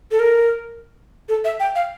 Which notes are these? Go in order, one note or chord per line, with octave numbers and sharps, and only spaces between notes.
A4
A#4
A4
E5
G5
F5